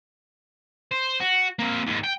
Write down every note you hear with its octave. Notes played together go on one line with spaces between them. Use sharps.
C5
F#4
A#3 C4
D#2 G#2
G5